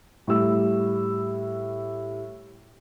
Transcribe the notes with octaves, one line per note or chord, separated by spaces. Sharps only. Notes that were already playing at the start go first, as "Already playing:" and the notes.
A2 G3 E6